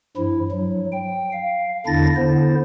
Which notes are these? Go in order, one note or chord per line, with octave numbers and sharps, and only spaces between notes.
G2 F3 E4
F#3
G5
F5
E2 D3 D4 E4 A6 A#6
D3 B3 E4 C5